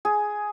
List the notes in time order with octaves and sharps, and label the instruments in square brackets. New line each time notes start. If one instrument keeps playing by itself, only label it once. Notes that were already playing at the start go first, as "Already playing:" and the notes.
[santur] G#4